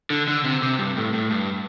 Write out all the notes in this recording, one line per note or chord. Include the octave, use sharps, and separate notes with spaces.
D3
D3
C3
C3
G2
A2
A2
G2